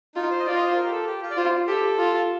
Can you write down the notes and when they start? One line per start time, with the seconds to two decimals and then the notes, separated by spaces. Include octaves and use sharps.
0.15 D#4 F4
0.30 C5
0.40 D#5
0.46 F4 D5
0.56 D#5
0.66 C5
0.76 A#4
0.85 G4
0.91 A4
1.07 G4
1.22 F4
1.31 D5
1.37 F4 C5
1.67 G4 A4
1.98 F4